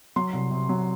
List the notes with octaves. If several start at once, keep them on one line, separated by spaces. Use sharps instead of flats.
F#3 C6
C2
C3
F#3